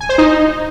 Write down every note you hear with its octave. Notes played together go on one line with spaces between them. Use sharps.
G#5
C5
D#4